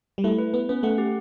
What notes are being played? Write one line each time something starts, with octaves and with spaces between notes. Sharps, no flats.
G3
A3 E4
B4
B3 B4
B3 C#4
A3 F#5
G4